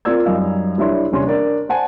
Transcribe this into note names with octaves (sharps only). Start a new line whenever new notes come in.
C4 F4 A#4 D5 E6 G#6
F#2 G3 D#4 F5
C2 D4 E4 C#5 C6
D#1 C3 C#4 D4 C6
D4 A#4 D5
C5 F#5 G#5 A5